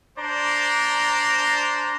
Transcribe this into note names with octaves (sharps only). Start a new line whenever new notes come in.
D4 C5 D5 A#5